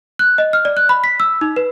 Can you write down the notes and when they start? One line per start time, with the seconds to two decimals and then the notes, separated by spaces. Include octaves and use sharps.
0.19 F#6
0.38 D#5
0.53 F6
0.65 D5
0.77 F#6
0.89 B5
1.04 B6
1.20 E6
1.41 D#4
1.56 B4